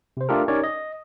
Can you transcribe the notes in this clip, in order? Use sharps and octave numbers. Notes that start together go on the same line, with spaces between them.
C3 C5
A3 D4 F4 G4 A4 A#4
C#4 D#4 G4 A#4 C#5 D5
D#5